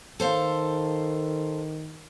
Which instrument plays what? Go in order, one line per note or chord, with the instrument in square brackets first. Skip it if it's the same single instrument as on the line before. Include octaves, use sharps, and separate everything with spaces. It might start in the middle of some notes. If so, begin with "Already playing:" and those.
[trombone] D#3 [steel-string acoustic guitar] A4 C5 F5